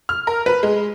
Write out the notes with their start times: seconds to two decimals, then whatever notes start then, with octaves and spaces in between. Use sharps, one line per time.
0.09 F6
0.27 A#4
0.46 B4
0.63 G#3